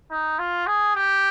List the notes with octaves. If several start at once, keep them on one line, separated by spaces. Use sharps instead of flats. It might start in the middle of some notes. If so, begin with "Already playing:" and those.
D#4
F4
G#4
G4